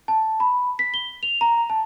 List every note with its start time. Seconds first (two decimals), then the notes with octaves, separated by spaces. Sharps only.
0.08 A5
0.40 B5
0.79 B6
0.94 G7
1.23 F7
1.41 A#5
1.70 A5